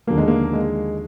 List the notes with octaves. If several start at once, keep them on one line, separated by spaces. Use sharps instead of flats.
D#2 D3 F3 A#3
G#3
A#3
G#3